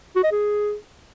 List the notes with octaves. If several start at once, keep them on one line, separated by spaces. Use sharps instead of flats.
F#4
D#5
G#4